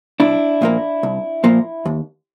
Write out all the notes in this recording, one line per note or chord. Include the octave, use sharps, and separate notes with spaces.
C2 D4 E4
A#2 F3 A#3
C2
A#2 F3 A#3
D#2